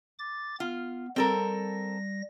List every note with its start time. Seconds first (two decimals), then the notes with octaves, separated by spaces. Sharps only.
0.19 D6 A6
0.60 B3 F4
1.16 G3 C4 A4 A#4 A#6